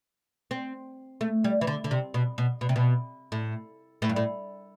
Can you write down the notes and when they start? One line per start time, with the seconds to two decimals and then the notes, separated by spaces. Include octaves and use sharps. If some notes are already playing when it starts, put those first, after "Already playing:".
0.51 C4
1.21 A3
1.44 G3
1.61 E3
1.67 D3
1.84 D3
1.91 C3
2.14 B2
2.38 B2
2.61 B2
2.69 C3
2.76 B2
3.32 A2
4.02 A2
4.09 G2
4.16 A2